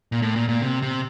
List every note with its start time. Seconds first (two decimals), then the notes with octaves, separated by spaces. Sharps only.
0.12 A#2
0.22 A2
0.36 A#2
0.49 A#2
0.62 C3
0.82 C3